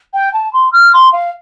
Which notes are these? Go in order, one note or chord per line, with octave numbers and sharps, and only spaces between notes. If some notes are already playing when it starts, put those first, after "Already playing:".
G5
A5
C6
F6
C6
F5